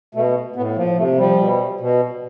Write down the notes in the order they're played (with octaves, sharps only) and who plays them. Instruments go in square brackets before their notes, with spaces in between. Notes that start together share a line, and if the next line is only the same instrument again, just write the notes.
[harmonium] B2 A3
A2 B3
F3 A#3
C3 A3
F3 G3
B2
B2